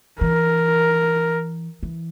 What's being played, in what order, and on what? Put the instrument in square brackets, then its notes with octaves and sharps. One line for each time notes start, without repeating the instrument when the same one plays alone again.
[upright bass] E3 [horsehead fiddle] A#4
[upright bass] E3